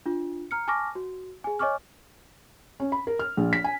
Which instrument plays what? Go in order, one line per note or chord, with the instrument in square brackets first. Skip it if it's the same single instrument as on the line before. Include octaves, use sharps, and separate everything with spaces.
[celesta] D4 F4
A#5 F6 C#7
G#5 A5 C#6 D6 F6 A#6
F#4
G#4 G#5
C#5 D#5 G#5 C#6 D6 F6
[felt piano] C#4
B5
A#4
F6
A#1
B6
G#5